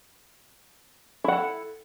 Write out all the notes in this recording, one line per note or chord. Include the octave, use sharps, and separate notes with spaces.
E4 A4 F#5